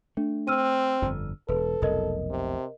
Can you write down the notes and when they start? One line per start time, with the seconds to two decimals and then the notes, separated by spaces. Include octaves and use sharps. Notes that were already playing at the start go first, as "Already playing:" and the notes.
0.17 A3 D4
0.48 C4 E6 F6 D#7
1.02 G1 F2 D3
1.49 E1 A4 B4
1.82 F1 B1 F2 A#4 D#5
2.30 C3